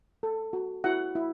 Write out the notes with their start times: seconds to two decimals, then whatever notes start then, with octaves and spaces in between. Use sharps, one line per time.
0.23 A4
0.53 F#4
0.84 E4 F#4 F#5
1.15 E4